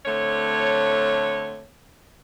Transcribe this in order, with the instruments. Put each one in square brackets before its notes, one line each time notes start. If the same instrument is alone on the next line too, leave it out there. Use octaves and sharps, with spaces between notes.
[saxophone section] D3 A3 C4 C#5